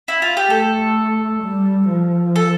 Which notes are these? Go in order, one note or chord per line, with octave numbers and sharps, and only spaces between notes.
E4
F4
G4
A3 A4
G3
F3
A4